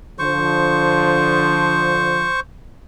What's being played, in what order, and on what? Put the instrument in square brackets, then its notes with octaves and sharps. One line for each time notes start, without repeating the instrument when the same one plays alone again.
[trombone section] D3 F3 [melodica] C5 C#6